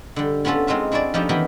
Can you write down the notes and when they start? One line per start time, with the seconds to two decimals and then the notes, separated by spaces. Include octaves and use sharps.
0.16 D3 G3
0.45 B3 C#4 F4 F#4 A4
0.67 G#3 C4 D#4 F4 E5
0.92 D4 E4 F#4 G#4 D5
1.14 F3 A3 C#4 D#4 E4 G4
1.29 D#3 E3 B3 G4 A#4 B5